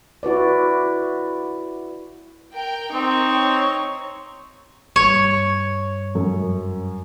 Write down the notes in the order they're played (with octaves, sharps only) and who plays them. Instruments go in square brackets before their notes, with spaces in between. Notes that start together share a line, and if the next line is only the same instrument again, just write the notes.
[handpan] E4 F#4 B4 D5
[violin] A#4 [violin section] G5
[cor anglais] C4 [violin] D#4 C#6
[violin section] C#5
[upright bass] G2 [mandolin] C#5
[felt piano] F#2